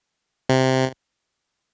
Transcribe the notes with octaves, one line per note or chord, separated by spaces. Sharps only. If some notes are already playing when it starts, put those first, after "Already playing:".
C3